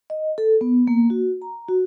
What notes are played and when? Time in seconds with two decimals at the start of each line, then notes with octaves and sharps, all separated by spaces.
0.10 D#5
0.38 A4
0.61 B3
0.87 A#3
1.10 F#4
1.42 A#5
1.68 F#4